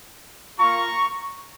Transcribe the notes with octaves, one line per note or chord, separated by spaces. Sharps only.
A#3 F4 A#5 C#6